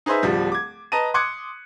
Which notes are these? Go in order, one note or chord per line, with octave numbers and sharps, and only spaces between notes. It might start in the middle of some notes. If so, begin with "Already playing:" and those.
D#4 G#4 B4 C5 E5
D1 F3 G3
D6 G#6
B4 D#5 A5 A#5 D#7
C6 D6 D#6 F#6 G#6 C#7